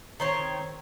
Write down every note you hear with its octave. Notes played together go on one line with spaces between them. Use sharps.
D#3 C4 C#5